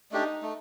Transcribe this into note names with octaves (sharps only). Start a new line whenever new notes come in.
A3 D4 D#4 G4
A3